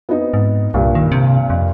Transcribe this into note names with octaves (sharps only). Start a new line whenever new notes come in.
B3 C4 D#4
G#2
C2 G2 A#2
D#3
C3
F2